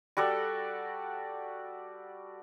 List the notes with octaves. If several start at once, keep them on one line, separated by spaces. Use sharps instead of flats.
G3 F#4 A4 D5